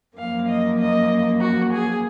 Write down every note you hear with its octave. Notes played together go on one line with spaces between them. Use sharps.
F#2 F3 A#3 F5
D#5
D#5
F#4
G#4